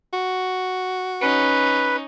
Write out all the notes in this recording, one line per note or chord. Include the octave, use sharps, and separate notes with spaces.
F#4
C#4 D#4 B4